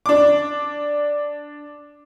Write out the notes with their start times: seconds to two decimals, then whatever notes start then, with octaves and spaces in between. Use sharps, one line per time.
0.06 D4 D6